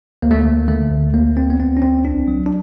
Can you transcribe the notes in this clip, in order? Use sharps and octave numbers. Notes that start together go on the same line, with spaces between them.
D2 A#3
A3
A#3
D2
D3 A3
D2
D2 A#3
D2 C4
B3
D2 C4
C#4
D2 C4
C2 D4
F#3
D4